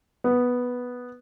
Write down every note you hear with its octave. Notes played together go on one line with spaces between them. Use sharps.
B3